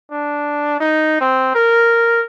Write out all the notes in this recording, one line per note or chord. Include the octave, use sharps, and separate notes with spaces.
D4
D#4
C4
A#4